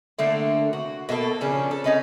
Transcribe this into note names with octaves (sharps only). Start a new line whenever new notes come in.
D3 A3 A#3 C4
F#4
B2 A#3 C4 A4
C#3 F3 C#4 D4
A4
C#4 D#4 B4